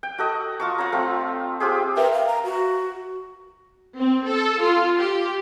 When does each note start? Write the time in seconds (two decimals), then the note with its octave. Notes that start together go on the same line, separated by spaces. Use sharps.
0.03 G5
0.18 F#4 A4 D#5
0.60 F4 A5 C#6
0.78 F4 C5 C#5 A#5
0.92 A3 C4
1.60 C4 F4 G4 G#4
1.97 A#4 B4 E5 G5
2.13 F5
2.27 A#5
2.44 F#4
3.97 C4
4.27 A4
4.62 F4
4.97 G4